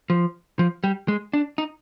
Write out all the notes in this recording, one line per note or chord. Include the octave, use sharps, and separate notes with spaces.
F3
F3
G3
G#3
D4
D#4